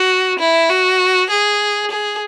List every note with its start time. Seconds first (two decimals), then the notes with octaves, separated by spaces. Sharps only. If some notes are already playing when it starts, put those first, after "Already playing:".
Already playing: F#4
0.39 E4
0.69 F#4
1.30 G#4
1.91 G#4